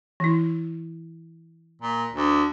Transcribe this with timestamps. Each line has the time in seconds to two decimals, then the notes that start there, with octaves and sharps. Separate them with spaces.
0.20 E3 E4
1.82 A#2
2.13 D2